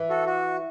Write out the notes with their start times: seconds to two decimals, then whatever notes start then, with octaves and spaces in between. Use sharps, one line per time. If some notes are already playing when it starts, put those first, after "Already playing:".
Already playing: E3
0.09 F#4 A4
0.26 F#4